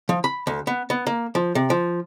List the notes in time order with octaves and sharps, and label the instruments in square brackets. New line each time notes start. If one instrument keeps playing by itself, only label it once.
[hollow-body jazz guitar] F3
B5
D2
B3
B3
A#3
F3
C3
F3